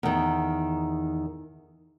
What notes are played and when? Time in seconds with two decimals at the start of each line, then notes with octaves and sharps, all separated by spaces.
0.03 E2 D#3